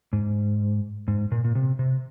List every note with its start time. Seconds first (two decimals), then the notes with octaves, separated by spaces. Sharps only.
0.13 G#2
1.08 G#2
1.32 A#2
1.44 A#2
1.55 C3
1.79 C3